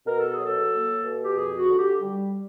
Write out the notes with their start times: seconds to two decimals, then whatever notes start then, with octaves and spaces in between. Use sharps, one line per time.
0.06 B2 A#4
0.19 A4
0.33 G#4
0.39 F#3
0.45 A4
0.71 A#3
1.03 B2
1.23 G4
1.35 F2 G#4
1.57 F#4
1.67 D3
1.78 G4
2.00 G3